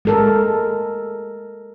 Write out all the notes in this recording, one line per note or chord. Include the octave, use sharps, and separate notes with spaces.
G#3 A4 A#4